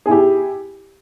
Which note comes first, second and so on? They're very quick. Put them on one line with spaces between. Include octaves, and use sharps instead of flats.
G#4 E4 G4